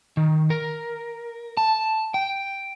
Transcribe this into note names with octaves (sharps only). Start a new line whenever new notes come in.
D#3
A#4
A5
G5